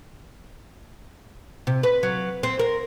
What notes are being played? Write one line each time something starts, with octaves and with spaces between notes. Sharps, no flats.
C3
B4
F#3
C4
A#4